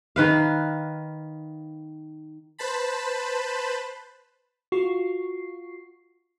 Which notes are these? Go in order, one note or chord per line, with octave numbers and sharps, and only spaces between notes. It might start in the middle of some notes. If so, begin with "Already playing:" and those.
D#3 B4 F5
B4 C5 A5 B5
F4 F#4 C#6 C7